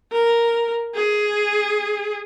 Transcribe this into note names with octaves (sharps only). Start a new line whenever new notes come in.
A#4
G#4